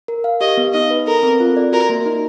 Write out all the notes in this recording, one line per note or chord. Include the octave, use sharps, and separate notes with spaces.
A#4
F5
G4 D#5
B3
D#4 D#5
B4
A4 A#4
C4
F4
D5
F#4 A#4
A#3
D#4